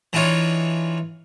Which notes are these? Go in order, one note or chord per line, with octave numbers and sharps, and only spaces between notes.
E3 D4 D#4 F4 C#5